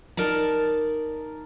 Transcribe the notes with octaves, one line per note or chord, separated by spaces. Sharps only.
D#4 A#4 D5 A5